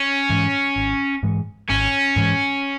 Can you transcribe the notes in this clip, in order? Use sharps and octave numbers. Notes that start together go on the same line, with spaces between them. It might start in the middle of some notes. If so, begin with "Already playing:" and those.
Already playing: C#4
G#2 E3 G#3
G#1
G#2 E3 G#3
G#1 C#4
G#2 E3 G#3